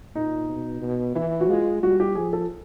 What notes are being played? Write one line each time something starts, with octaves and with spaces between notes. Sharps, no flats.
A#2 D#4
B2
B2
E3 E4
F#4
G#3 F4
G3 F#4
G4
F3 G#4
A4